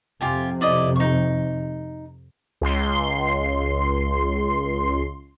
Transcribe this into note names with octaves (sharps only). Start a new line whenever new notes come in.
F2 C3 F4 G4 G#5
E4 D5 D#5
D#4 C#6
C#2 C6